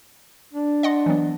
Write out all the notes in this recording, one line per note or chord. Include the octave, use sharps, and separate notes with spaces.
D4
D#5 F#5 C6
E3 F#3 B3